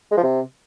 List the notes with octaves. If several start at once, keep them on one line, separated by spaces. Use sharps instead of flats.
G#3
F3
C3